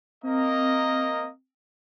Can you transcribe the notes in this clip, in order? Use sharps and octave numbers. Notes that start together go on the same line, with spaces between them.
A#3 C4 A#4 D#5